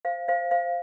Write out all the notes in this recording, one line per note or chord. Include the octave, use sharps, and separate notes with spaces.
C5 F5
C5 F5
C5 F5